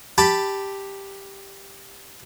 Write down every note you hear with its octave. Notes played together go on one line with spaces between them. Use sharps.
G4 A5 B5